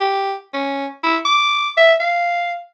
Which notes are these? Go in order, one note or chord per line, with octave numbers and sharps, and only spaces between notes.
G4
C#4
E4
D6
E5
F5